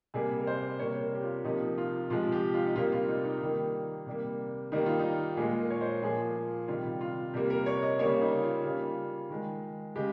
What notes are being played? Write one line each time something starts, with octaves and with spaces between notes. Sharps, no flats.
C3 G3 A#3 G#4
A#4
C5
C3 G3 A#3 C#5
A#4
G4
F4
C3 F3 A#3 D#4
F4
C3 F3 G#3 F4
G4
F4
D#4
C3 G3 A#3 F4
F4
D#4
D#4
D#3 G3 A#3
C3 G3 A#3
D#3 G3 A#3 D#4
F4
D#4
A#2 G#3 G#4
A#4
C#5
C5
A#2 F3 A#3 G#4
F4
C3 D#3 G3 F4
F4
C3 G3 A#3 G4
A#4
C#5
D#5
C#3 G3 A#3 C#5
D#4
F4
C#3 G3 A#3
D#3 G#3
C#3 G#3 G4